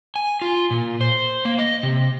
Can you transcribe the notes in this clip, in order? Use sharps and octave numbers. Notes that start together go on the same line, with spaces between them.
G#5
F4
A#2
C5
A#3
D#5
C3